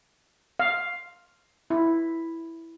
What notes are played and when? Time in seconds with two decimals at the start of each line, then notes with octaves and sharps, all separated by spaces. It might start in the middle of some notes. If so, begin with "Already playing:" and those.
0.60 F5
1.70 E4